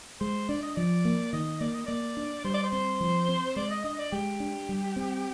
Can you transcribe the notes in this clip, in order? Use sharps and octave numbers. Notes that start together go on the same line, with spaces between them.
G#3 C5
D4 D5
D#5
F3 D5
A#3
D#3 D#5
A#3 D5
D#5
A#3 D5
D4
G3 C5
D5
C5
C4
F3
C4
G#3 D5
D#5
D4 D#5
D5
G#3 G4
D4
G3
C4